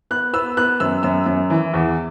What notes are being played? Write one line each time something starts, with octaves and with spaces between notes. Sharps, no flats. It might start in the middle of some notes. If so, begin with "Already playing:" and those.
B3 F#6
B3 E6
B3 F#6
F#2 E6
F#2 E6
F#2
E3
E2